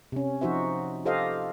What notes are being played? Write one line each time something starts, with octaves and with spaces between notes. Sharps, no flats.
C3 C#4
F3 D#4 F#4 C5 E5
F4 G4 A4 C5 D#5 F5